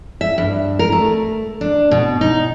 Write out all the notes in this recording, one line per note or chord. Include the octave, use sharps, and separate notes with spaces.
E5
G2
A#4
A3
D4
B2
D#4